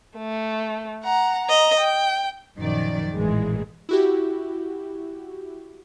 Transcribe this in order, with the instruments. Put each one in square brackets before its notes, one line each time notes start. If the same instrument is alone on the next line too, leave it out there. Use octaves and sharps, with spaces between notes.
[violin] A3
F#5 A#5
D#5 A#5
G5
[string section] A#1 F#2 D#3 F3 D5
A1 A#2 E3 G#3
[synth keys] E4 F#4 G4